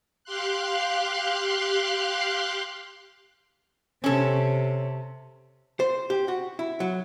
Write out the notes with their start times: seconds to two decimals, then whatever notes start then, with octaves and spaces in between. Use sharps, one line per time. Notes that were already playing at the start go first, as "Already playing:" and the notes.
0.24 G4 F5 C6 F#6
4.04 C3 C#4 A4
5.80 C5
6.10 G4
6.28 F#4
6.59 E4
6.80 F#3